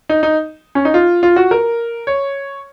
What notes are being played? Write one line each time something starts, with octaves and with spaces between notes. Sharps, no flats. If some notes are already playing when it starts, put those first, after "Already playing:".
D#4
D#4
C#4
D#4
F4
F4
F#4
A#4
C#5